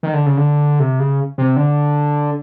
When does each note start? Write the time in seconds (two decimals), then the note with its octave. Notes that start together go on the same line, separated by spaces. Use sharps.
0.03 D#3
0.13 D3
0.26 C#3
0.37 D3
0.80 C3
1.00 C#3
1.38 C3
1.56 D3